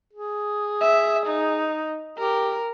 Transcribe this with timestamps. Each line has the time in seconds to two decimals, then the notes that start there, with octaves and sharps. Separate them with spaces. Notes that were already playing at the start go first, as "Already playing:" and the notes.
0.13 G#4
0.81 E5
1.26 D#4
2.18 G4 A#4